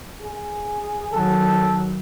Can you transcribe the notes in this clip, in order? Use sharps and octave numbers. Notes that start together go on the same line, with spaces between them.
G#4
D#3 F#3 A4